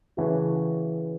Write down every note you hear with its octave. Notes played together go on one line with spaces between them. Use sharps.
C#3 E3 A3 F#4